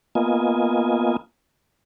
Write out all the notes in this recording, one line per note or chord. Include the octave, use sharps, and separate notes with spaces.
A#3 B3 F4 D#5 G#5